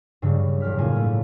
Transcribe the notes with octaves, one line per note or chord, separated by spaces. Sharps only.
G2 C#3 F#3 G3
E1 G4 F6 B6
A2 C#3 A#3 F4 G#5
A3